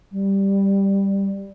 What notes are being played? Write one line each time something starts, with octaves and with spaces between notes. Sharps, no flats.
G3